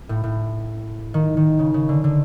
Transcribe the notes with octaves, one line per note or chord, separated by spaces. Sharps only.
A2
A2
D#3
D#3
C#3
C#3
D3
D3